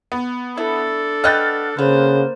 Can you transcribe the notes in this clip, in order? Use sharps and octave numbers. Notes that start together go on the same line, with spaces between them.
B3
D4 E4 A4
B3 D#5 G5 F6 F#6 A6
C#3 A#3 B3 C5